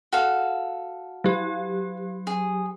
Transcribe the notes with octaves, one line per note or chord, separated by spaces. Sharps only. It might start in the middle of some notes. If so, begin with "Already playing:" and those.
F#4 A4 F5
F#3 G4
G#4